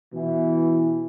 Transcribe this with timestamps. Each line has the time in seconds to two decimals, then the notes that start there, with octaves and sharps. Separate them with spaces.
0.13 B2 E3